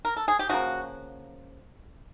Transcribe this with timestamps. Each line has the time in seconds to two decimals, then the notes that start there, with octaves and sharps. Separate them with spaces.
0.05 A#4
0.17 A4
0.28 G#4
0.39 G4
0.49 C#3 F3 A#3 F#4